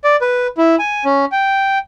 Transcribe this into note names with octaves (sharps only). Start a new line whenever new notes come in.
D5
B4
E4
G#5
C#4
G5